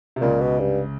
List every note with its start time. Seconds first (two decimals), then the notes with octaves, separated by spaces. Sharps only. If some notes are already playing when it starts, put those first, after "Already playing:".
0.16 C3
0.21 C#2 A#2 C#3
0.41 B2
0.60 G2